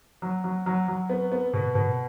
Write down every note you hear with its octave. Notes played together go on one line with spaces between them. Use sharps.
F#3
F#3
F#3
F#3
B3
B3
B2
B2